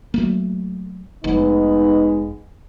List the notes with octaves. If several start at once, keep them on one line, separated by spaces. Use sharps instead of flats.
F#3 A3 A#3
F1 G#3 B3 D#4